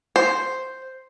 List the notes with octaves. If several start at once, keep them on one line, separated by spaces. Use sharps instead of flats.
C5